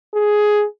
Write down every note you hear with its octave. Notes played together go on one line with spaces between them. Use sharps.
G#4